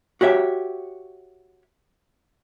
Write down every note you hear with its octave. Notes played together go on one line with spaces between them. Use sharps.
F#4 G4 C#5 E5